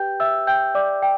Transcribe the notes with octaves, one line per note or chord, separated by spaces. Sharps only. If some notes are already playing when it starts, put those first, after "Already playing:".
Already playing: G4 B4 G5 G6
E5 E6
G5 G6
D5 D6
G5